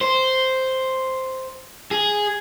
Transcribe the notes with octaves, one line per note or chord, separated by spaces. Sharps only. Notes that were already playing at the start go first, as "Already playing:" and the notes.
C5
G#4